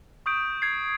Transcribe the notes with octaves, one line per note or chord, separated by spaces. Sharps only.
C#6 D#6 G6 D7
G#6 C7